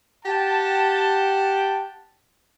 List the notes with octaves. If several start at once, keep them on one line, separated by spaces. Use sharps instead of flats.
G4 F#5 G5 A5